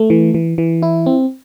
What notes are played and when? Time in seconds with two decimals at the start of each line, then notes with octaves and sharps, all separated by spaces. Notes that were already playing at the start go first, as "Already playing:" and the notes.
Already playing: A3
0.10 E3
0.34 E3
0.58 E3
0.82 E4
1.06 C4